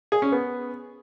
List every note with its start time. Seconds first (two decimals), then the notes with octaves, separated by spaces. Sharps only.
0.12 G#4
0.22 C#4
0.32 B3